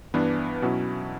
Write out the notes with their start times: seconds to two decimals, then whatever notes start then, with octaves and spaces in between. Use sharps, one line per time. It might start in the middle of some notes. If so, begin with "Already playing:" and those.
0.14 G2 E3 B3 D4
0.62 B2 F#3 C#4 E4